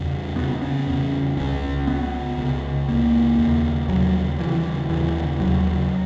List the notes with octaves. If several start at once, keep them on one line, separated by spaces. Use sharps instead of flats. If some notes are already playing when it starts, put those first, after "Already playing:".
Already playing: E2 C#3
E2 C#3 B3
C#4
E2 C#3
C#2 C#3 C#4
C#2 C#3 B3
C#2 C#3
C#2 C#3 A#3
D#2 C#3
D#2 C#3 F#3
D#2 C#3 E3
D#2 C#3 E3
D#2 C#3 F#3